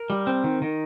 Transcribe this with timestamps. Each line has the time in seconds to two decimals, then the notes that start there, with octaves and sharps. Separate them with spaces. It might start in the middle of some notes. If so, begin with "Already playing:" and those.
Already playing: A#4
0.10 G3
0.27 C4
0.44 D#3
0.62 D#3